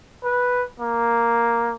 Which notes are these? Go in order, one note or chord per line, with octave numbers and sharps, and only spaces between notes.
B4
A#3